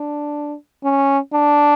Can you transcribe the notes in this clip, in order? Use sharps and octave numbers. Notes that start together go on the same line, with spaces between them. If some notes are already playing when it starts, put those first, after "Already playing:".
Already playing: D4
C#4
D4